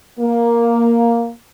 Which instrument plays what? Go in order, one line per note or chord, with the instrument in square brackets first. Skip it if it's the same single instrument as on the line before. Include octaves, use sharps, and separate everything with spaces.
[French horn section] A#3